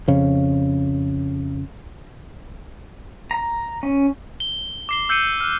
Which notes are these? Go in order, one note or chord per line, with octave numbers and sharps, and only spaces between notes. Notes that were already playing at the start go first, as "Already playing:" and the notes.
F2 C#3
A#5
C#4
G7
D6 C7 G7
E6 G6 C7 C#7 D#7
F6 F#6